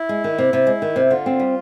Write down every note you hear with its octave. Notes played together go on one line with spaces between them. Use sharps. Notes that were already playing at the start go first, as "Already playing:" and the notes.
Already playing: E4
G#3
D#3
C3
C3
G#3
D#3
C3
E4
D3 F4
C4
G3